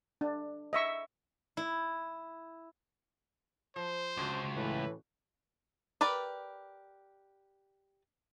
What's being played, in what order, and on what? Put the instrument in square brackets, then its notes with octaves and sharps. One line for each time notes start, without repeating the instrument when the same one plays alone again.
[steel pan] D4
D#5 E5 C#6
[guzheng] E4
[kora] F3 [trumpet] C5
[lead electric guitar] C#2 [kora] C#3 D4 F#4
[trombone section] A2 E3 [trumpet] B4
[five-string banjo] G4 A#4 B4 D5